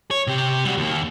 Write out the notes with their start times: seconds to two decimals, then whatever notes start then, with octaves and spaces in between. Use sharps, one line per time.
0.11 C#5
0.27 C3 G4
0.65 G3 F#4
0.78 D#2 A#3